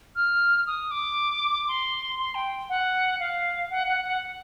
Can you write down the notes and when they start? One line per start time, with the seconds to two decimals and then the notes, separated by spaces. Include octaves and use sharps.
0.15 F6
0.67 D#6
0.91 D6
1.68 C6
2.19 C6
2.35 G5
2.69 F#5
3.20 F5
3.70 F#5
3.87 F#5
4.04 F#5